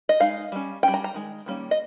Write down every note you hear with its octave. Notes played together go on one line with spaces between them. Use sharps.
D#5
G#3 D#4 F5
G3 C#4
G3 C#4 G5
A#5
A#5
D#3 G#3
D#3 G3 A#3 C#4
D#5